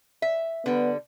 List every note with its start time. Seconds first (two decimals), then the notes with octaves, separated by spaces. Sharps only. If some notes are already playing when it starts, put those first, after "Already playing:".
0.22 E5
0.66 D3 G3 B3